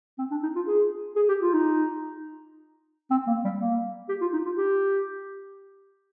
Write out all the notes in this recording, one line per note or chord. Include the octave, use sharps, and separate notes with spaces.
C4
D4
D#4
F4
G#4
G#4
G4
F4
D#4
C4
A#3
G3
A#3
G4
F4
D#4
F4
G4